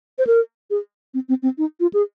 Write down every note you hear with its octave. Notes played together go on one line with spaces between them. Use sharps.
C5
A#4
G#4
C4
C4
C4
D#4
F4
G#4